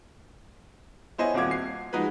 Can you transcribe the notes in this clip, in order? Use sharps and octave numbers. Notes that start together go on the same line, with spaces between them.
B3 E4 C5 C#5 D#5 G#5
D#1 C4 F#4 F5 D6 G#6
C7
F3 G#3 D#4 F#4 B4